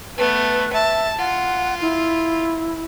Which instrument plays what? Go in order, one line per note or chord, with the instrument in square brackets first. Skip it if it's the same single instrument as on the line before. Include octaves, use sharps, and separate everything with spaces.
[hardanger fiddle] A3 B3 [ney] B4
[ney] E5 [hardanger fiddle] A5
[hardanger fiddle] F4 [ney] F#5
[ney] E4